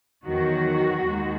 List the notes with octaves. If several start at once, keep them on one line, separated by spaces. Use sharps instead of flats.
E2 D#3 F#3 F#4
D#2 D#3 G#3